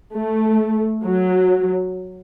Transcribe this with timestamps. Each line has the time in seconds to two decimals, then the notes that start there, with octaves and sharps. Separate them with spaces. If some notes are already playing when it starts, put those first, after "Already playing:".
0.16 A3
1.04 F#3